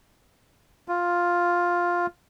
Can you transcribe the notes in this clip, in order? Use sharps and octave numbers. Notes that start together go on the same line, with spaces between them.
F4